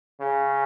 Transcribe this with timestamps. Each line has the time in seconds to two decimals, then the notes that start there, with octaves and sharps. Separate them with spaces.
0.20 C#3